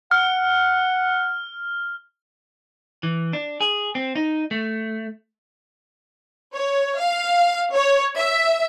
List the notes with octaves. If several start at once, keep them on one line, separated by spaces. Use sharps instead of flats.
F#5 F6
E3
D4
G#4
C4
D#4
A3
C#5
F5
C#5
E5